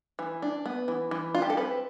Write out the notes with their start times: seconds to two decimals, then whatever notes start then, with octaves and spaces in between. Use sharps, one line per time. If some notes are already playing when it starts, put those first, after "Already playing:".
0.19 E3
0.42 D4
0.66 B3
0.88 E3
1.11 E3
1.35 D4 F4
1.42 G4
1.50 A4
1.57 C4 B4